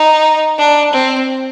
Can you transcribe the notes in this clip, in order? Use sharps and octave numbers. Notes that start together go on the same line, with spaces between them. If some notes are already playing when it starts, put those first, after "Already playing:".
Already playing: D#4
D4
C4